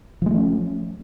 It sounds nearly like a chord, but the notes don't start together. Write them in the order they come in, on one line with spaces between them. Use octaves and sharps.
F3 G#3 A3 C#4